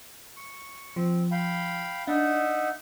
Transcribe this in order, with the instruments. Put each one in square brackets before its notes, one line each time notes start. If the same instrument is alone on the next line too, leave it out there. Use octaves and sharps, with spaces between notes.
[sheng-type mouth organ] C#6
[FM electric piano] F3 [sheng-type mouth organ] C4
[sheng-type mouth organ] F5 G5 B5
[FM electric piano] D4 [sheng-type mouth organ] D#4 E5 F#5